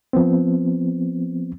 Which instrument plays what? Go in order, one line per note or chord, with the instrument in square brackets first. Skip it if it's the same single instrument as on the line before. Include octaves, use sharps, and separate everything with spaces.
[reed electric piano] F3 B3 C4